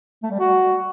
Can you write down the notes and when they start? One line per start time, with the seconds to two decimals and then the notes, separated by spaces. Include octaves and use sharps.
0.23 A3
0.31 G3
0.39 F#4